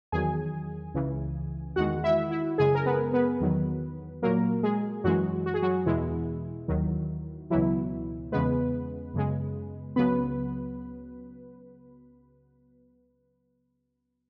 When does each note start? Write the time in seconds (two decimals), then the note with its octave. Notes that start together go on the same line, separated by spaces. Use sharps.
0.12 E2 D#3 F#3 G#4 G#5
0.94 C#2 C#3 E3
1.76 E2 D#3 G#3 F#4 F#5
2.04 E4 E5
2.31 E4 E5
2.58 F#2 C#3 G#3 G#4 G#5
2.75 A#4
2.86 B3 B4
3.13 B3 B4
3.40 E2 D#3 F#3
4.22 A#2 F#3 A#3 A#4
4.63 G#3 G#4
5.04 F#2 E3 F#3 G#3 F#4
5.46 F#4
5.54 G#4
5.62 F#3 F#4
5.86 E2 B2 E3 G#3 E4
6.68 D#2 D#3 F#3
7.50 C#2 B2 E3 F#3 E4
8.32 E2 C#3 G#3 B3 B4
9.14 F#2 C#3 G#3
9.96 C#2 C#3 F#3 B3 B4